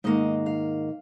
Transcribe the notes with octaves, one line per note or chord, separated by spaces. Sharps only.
G#2 D#3 A#3 D#5
F5